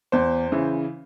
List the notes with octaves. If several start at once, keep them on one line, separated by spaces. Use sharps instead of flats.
E2 C5
C#3 E3